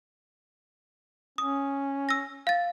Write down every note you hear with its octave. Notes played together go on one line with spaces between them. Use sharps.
C#4 D#6
E6 A#6
F5 A6